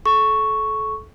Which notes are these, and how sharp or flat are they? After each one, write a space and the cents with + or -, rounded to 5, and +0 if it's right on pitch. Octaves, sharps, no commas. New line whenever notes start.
A4 -30 C#6 +0